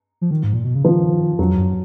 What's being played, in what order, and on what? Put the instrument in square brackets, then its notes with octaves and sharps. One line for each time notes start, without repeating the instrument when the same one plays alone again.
[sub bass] F3
D#3
G#2
A#2
B2
C#3
[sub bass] D#3 [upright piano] F3
[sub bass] F2 [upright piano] F#3
[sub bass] F#2